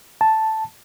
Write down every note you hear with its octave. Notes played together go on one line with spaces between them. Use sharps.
A5